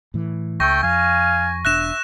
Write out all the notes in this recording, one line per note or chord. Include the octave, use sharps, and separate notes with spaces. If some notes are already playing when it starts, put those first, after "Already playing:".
A2 E3
C#2 A3 G5 C#6 A#6
F2 F5 G#5
E1 D4 E5 F#6 A#6 E7